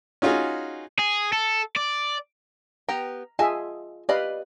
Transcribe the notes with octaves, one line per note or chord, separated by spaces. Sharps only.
C#4 D#4 F4 F#4 G#4
G#4
A4
D5
B3 G4 G5 A#5
F4 G#4 D#5 E5 G#5 A5
G4 B4 D5 D#5 F5 B5